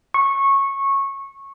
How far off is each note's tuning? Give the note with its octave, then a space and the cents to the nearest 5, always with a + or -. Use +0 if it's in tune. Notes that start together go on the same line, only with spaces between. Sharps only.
C#6 -15